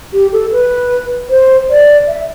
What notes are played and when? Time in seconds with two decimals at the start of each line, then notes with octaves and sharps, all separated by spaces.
0.13 G4
0.32 A4
0.52 B4
1.30 C5
1.70 D5
2.08 E5